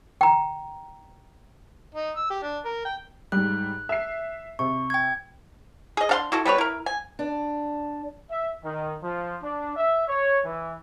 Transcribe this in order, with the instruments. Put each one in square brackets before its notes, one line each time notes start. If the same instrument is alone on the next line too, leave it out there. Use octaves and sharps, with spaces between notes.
[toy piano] G5 A#5
[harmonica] D#4
E6
G4
D4
A#4
G5
[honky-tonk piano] G#2 G3 [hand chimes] F#6
[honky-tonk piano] E5 C7
[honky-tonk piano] C3 [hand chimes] C#6
[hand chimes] G5 G#6
[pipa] G#4 D#5
D4 F5 C6
E4 F#4 A4
G3 B3 B4 C#5
E4 A#4
G#5
[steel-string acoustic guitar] D4
[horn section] E5
D#3
F3
D4
E5
C#5
E3